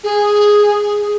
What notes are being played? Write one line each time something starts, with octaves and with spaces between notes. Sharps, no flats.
G#4